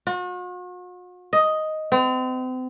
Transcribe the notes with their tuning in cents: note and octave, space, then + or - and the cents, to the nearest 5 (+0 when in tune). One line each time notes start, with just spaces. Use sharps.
F#4 -45
D#5 +5
C4 -40